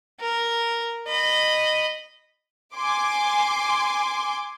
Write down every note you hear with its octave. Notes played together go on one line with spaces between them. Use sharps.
A#4
D#5 B5
G#5 C6 D6